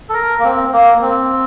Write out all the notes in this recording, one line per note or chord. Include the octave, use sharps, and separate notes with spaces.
A4
A#4
A#3
C4
A#3
C4